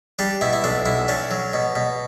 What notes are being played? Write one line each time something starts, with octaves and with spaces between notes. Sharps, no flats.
G3 D4
B2 E4
E4
B1 D4
B1 E4
C#4 D4
F#3
B2
B2